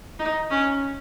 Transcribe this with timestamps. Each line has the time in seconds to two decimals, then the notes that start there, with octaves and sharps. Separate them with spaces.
0.19 D#4
0.51 C#4